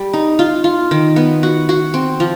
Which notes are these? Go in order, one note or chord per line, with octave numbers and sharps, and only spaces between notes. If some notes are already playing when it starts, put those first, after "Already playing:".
Already playing: G3
D#4
F4
F4
D#3
B3
F#4
F#4
C4
F3